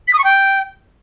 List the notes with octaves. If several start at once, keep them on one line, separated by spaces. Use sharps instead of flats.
B6
D#6
C#6
G5